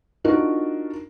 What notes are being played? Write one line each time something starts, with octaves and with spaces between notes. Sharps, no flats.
D4 D#4 F4 F#4 A#4